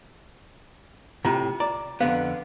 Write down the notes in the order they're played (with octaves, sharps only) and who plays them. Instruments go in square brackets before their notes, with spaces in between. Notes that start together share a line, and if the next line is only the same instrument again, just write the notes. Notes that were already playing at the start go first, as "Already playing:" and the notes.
[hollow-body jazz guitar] A2 C3 [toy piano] F4 A#5
[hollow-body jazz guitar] D5 [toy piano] A#5
[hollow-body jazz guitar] F2 D3 B3 [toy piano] F5